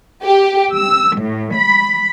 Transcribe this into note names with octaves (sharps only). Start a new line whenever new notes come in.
G4
E6
A2
B5